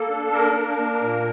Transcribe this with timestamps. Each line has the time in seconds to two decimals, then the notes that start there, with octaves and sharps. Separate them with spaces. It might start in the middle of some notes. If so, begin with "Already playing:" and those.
Already playing: A#3 A4
0.09 D4
0.32 A#3 A#4
0.56 D4
0.78 A#3
1.02 A#2